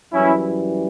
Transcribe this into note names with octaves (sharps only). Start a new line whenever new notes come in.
F#2 E3 G3 C#4 E4